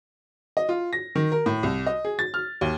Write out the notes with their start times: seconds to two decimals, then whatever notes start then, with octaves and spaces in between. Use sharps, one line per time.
0.57 D#5
0.69 F4
0.93 A#6
1.16 D#3
1.32 A#4
1.46 A2
1.63 C2
1.86 D#5
2.05 G#4
2.19 A6
2.34 F6
2.61 D#2